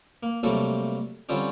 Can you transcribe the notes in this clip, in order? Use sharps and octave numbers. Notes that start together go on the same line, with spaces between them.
A#3
C3 F#3 G3 A3 A#3 A4
D3 F3 G3 C4 C#4